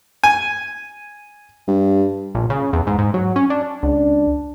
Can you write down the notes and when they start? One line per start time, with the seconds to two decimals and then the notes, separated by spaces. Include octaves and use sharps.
0.24 G#5
1.68 G2
2.35 A#1
2.50 C#3
2.73 E2
2.87 G#2
2.98 G#2
3.14 F#3
3.36 C#4
3.50 D4
3.83 C#2 D4